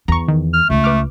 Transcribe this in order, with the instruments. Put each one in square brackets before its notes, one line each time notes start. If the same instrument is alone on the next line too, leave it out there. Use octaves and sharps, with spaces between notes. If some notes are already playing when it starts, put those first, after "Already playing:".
[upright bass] E2 [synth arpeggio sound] A#5 C#6
[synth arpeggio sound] D#3
[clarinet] F6
[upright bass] C#2 [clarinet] A3
[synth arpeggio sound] B4 D6 F6